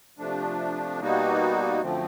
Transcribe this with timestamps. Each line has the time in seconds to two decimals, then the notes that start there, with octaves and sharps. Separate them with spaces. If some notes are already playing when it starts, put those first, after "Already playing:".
0.18 C3 F3 A3 D4
1.00 B2 G3 A#3 D#4 F#4
1.82 F#2 D3 F3 A3 C4